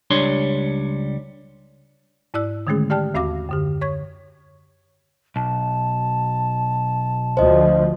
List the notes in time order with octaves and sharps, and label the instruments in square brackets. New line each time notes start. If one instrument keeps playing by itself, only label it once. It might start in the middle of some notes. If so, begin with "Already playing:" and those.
[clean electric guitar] C#2 G3 D4 C#5 C6
[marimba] G#2 E4 D5 E6 F#6
D3 D#3 G#3 A3 C#4 G#4
G4 D5 G5 A5 F6 F#6
D#2 C4 F#4 F5 D6 A#6
F#2 D3 G4
C#5 C#6 G#6
[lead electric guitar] B1 [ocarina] A5
[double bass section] D2 F3 [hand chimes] C5 D#5